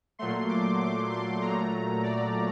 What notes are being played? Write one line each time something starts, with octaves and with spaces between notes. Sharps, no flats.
A#2 F#3 A3 C6
D6
D6
C6
A#2 F#3 A3 A#5
D5